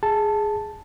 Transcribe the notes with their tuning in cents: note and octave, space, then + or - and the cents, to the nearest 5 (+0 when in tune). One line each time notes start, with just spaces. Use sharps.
G#4 +0 A5 +0